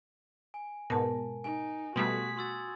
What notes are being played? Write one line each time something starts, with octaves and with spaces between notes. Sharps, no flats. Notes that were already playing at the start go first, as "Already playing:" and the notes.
G#5
G#2 B2 A#4 A5
D#4 G#5
B2 G3 A3 F#4 C6 D#6 G#6 B6
F#4 C6 E6 A6